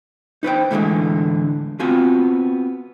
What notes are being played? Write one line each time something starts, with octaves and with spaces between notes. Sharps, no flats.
D#4 B4 C5 G5
A2 D3 E3 F3 G#3
B3 C4 F4 F#4 G#5